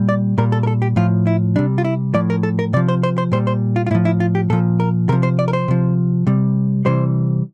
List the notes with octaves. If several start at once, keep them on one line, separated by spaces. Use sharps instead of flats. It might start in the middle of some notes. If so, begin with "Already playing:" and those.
Already playing: A#2 G3
D5
A#2 G3 A#4
A4
A#4
A4
G4
A2 F3 F4
E4
C3 G3 D4
F4
E4
A2 F3 D5
A#4
A4
A#4
C3 F3 D5
C5
C5
C5
A#2 G3 C5
C5
F4
F4
A2 F3 E4
E4
F4
G4
A#2 F3 A4
A#4
C3 F3 A#4
C5
D5
A#4
C5
C3 F3
C3 G3
C3 E3 G3 C5